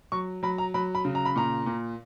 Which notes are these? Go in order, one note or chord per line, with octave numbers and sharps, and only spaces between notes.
F#3 C#6
F#3 B5
A#5
F#3 B5
B5
C#3
A#5
B5
A#2 A#5
A#2